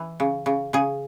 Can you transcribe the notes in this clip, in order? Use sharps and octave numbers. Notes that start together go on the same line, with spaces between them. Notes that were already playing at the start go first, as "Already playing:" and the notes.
Already playing: E3
C#3
C#3
C#3 G#4